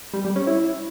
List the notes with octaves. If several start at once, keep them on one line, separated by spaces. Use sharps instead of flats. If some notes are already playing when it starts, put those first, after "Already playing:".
G3
G3
C#4
E4